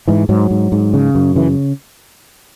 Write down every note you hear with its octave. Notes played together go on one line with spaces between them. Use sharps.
G#2 E3
G#2 F#3
G#2
G#2
C#3
F#2
C#3 E3